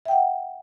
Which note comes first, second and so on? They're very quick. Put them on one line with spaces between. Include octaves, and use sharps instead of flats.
E5 G5 F#5